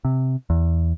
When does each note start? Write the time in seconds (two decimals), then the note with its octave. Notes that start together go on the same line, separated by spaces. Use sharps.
0.05 C3
0.50 E2